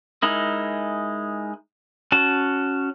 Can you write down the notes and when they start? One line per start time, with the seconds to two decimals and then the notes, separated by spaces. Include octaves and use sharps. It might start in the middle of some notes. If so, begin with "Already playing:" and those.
0.22 G#3 D#4 E4 A#4
2.12 C#4 F#4 A5